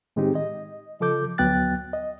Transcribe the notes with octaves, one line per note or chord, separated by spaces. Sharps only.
A2 D#3 G#3 C4 D#4 G4
D#5
C#3 F3 A4 D6 G6
D2 F#3 B3 G5 F#6 A6
D#5